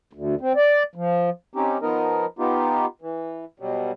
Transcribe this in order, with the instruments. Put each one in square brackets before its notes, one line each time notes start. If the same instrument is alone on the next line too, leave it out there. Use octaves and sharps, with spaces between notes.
[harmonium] D2
C4
D5
F3
C4 C#4 D#4 G4
F3 B3 D#4 A#4 D#5
B3 D#4 F4 G4
E3
B2 F#3 G3